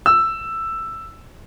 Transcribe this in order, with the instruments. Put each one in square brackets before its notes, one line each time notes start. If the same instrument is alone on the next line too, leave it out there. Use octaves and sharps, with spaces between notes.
[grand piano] E6